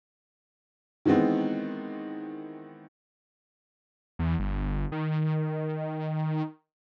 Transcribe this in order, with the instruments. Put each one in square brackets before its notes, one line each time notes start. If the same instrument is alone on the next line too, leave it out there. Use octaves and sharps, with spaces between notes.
[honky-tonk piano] D#3 E3 G#3 B3 C4
[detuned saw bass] E2
G1
D#3